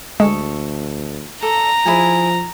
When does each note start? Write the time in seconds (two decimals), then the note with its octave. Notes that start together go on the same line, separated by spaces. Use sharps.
0.20 D2 G#3 A4 C#6 D#6
1.42 A4 D5 A#5
1.86 F3 E4 G#4 G#5